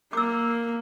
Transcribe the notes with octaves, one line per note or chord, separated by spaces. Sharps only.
A#3 D6 E6